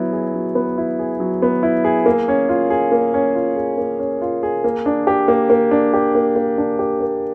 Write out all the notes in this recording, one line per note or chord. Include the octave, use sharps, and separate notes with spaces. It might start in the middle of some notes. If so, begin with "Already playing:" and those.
Already playing: F#3 B3 E4
G#4
F#3
B3
E4
G#4
F#3
B3
E4
G#4
A#3
C#4
F4
G#4
A#3
C#4
F4
G#4
A#3
C#4
F4
G#4
A#3
D4
G4
A#3
A#3
D4
G4
A#3
A#3
D4
G4
A#3